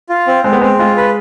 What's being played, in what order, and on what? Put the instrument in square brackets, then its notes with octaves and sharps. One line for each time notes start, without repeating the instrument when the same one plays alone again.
[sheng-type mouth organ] F4
C4
[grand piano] G#3 [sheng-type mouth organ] C4
[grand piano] B3
[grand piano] G#3 [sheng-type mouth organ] C4
[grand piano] G#3 [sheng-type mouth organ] F4
[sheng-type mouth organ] B4